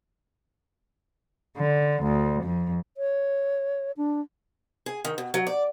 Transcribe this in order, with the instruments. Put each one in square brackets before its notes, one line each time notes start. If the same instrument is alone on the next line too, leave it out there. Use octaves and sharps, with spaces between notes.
[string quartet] D3
D2
F2
[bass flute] C#5
D4
[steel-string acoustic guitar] G#4
D#3
B2
F#3
D5